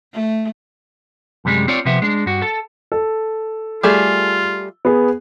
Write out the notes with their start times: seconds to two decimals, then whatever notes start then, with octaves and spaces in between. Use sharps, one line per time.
0.13 A3
1.45 F#2 C3 G3 G#3
1.68 C4 F4 C#5 D5
1.85 C3 F3 B3 E5
2.02 G#3 D4
2.26 G2 F#4
2.42 A4 A5
2.92 A4
3.83 G3 A3 F4 G#4
4.85 B3 G#4